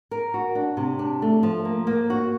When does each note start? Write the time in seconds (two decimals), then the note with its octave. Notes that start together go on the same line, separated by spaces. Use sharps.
0.11 A#4
0.34 F#4
0.55 D4
0.77 C3
0.99 D4
1.22 A3
1.43 F3
1.65 A#3
1.87 A#3
2.10 F#4